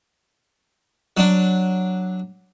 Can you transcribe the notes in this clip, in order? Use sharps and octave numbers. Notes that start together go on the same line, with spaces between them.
F#3 D4